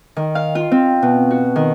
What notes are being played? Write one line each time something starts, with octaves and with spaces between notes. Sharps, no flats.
D#3
F5
F4
C4
B2
F#4
D#3